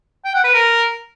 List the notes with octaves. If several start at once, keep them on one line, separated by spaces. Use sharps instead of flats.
G5
F#5
B4
A#4